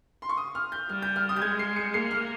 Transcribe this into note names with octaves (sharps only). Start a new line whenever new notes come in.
C6
C#6
D#6
F6
G6
G3 F6
G6
F6
D#6
G6
G#3 G#6
C7
C#7
A#3 C7
F6